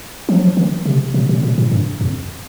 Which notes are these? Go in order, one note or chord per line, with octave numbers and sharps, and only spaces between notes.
F3
F#3
F3
D#3
C3
B2
B2
A#2
A2
G2
F2